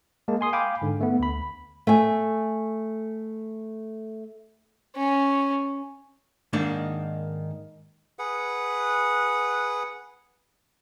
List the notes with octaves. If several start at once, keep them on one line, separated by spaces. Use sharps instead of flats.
G#3 A#3 A5
G#5 C6 D#6
F5 G5 G#5 B5 D6
G#2 D3
A3 B3
D2 B5
A3 G#5
C#4
G#2 D#3 A#3 D4
G#4 B4 F#5